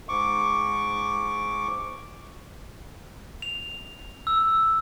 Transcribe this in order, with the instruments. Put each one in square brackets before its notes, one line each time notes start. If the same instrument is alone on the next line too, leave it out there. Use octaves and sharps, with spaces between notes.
[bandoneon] G#2 C#6 D6
[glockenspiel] F7
E6